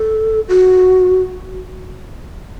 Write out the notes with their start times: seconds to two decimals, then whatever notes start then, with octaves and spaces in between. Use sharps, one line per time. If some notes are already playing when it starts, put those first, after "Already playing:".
Already playing: A4
0.49 F#4